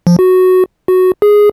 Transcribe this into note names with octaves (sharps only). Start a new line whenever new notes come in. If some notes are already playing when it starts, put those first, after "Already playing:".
F3
F#4
F#4
G#4